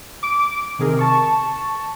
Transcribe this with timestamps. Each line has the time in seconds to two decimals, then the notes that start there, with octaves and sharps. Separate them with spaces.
0.23 D6 D7
0.79 C3 D#3 G#4 A#4
0.98 A5 C#6